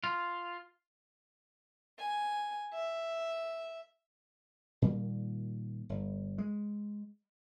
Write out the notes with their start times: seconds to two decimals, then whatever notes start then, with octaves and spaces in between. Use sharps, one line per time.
0.04 F4
1.99 G#5
2.74 E5
4.82 A#2 D#3 G3 A#3
5.89 G1
6.38 G#3